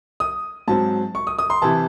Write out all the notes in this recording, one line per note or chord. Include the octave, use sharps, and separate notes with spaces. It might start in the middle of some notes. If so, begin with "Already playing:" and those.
D#6
G#2 F#3 C4 A5
C#6
D#6
D#6
C6
C3 E3 A5